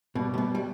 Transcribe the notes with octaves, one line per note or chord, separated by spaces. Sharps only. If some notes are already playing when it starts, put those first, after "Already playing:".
B2 G3
C3
B2
G3